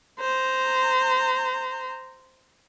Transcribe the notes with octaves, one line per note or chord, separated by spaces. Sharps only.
C5 A#5